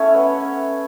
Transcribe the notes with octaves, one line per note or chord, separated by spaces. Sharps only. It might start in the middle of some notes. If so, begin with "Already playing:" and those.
Already playing: A3 C#4 E4 C#5
B3